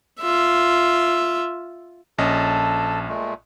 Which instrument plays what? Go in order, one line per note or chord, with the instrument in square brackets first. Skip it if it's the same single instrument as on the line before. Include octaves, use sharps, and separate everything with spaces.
[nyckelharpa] F4 E5
[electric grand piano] A#1 C#4 D#5 [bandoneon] A4 A5
[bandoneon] A#2 G#3 A3